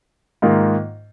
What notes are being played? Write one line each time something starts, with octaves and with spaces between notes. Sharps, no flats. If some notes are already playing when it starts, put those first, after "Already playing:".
G#2 D#3 A#3 F4